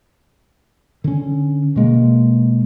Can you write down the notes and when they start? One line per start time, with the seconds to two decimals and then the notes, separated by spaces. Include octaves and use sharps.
1.04 D3 C#4
1.76 B2 G#3 A#3